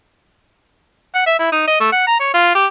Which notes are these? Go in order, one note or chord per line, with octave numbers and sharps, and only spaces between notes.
F#5
E5
E4
D#4
D#5
A3
F#5
A#5
C#5
F4
G4